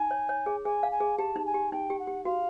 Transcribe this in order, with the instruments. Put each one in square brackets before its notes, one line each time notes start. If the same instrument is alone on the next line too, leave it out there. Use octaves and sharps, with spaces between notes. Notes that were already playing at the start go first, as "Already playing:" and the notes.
Already playing: [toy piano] D#4 [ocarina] G#5
[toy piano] C#5
C#5
G#4
[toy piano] G#4 [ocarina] G#5
[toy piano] F5
[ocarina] G#5
[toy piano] G#4
[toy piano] G4 [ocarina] A5
[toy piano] D#4
[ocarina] G#5
[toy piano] G4
[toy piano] D#4 [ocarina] G5
[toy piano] G4
[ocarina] F#5
[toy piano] G4
[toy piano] F#4 [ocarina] F5